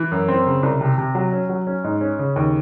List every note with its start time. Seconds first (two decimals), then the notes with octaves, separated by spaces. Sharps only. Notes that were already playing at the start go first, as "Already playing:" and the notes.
Already playing: E3
0.12 F#2
0.28 C4
0.46 C#3
0.63 C2
0.81 C3
0.98 C3
1.15 F#3
1.32 C#4
1.49 F#3
1.67 C#4
1.84 G#2
2.01 C#4
2.19 C#3
2.36 D#2